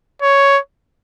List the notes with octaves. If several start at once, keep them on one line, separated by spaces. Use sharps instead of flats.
C#5